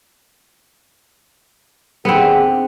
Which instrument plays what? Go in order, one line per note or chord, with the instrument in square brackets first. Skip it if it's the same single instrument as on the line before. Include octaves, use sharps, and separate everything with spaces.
[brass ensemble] D#2 D3 G#4 [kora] B3 C4